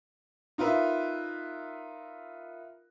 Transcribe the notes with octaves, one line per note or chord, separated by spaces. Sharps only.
D#4 F4 A#4 B4 E5